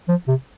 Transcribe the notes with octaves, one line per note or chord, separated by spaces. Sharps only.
F3
C3